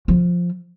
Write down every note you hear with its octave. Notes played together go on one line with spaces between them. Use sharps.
F3